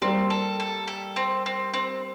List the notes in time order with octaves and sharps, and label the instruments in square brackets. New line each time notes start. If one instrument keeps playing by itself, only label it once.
[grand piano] G3 A#3 [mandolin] C4
[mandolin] A4
A4
A4
C4
C4
C4